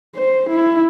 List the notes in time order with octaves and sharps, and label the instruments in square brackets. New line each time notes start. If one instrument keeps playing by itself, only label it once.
[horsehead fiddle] C5
E4